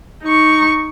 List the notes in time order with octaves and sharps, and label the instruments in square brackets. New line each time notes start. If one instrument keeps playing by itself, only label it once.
[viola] D#4 C#6